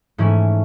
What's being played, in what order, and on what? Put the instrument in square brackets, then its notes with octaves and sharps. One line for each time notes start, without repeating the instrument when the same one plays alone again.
[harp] G#2 E3 A3 C#4 E4